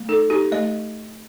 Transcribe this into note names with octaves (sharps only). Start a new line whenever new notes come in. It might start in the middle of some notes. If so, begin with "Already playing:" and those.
Already playing: A3
D#4 A4
D#4 G4
A3 D#5